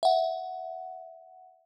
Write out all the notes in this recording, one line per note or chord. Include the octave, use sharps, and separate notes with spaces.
E5 F#5